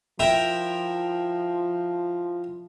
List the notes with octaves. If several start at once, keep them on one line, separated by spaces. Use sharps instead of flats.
F3 E4 A#4 G5